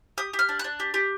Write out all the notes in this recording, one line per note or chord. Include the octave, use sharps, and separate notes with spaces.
G4 D#6
G4
F6
D4
D4 F#6
G4
G4